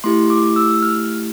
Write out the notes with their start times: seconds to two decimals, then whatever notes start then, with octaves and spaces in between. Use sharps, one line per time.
0.04 A3 E4 G4 C6
0.30 D6
0.56 E6
0.83 F6